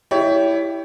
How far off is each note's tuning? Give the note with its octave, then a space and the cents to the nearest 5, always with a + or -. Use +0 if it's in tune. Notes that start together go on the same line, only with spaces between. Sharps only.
E4 +0 G4 +0 C#5 +30